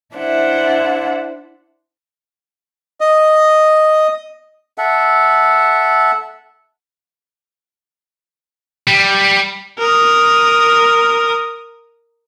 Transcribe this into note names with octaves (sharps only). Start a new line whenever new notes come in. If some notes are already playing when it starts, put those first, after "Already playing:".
D4 E4 C5 E5 F#5
D#5
A4 E5 F#5
G3
A#4 D#6